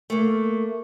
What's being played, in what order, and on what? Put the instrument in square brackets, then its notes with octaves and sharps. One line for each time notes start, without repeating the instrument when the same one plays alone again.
[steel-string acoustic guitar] A3 A#3